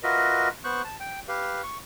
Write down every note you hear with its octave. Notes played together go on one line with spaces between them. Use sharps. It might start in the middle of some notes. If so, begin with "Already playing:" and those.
F4 F#4 A#4 B4 D#5 E5
B3 C5 C#6 F#6
A5
G5
G4 B4 F5
C#6